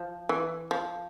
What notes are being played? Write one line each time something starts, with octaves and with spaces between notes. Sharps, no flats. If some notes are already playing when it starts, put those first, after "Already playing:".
Already playing: F3
E3
F3